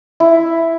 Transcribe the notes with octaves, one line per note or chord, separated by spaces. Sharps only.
E4